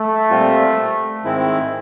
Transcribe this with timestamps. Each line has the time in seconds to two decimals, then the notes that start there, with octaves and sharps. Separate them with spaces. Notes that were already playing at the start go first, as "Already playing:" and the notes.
Already playing: A3
0.30 A#2 G3 C4 F4
1.24 G#2 D#3 G#3 C4 E4